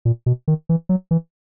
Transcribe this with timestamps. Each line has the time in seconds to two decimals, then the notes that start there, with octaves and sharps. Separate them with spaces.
0.05 A#2
0.26 B2
0.48 D#3
0.69 E3
0.89 F#3
1.11 E3